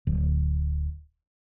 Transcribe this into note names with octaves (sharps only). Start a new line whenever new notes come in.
D1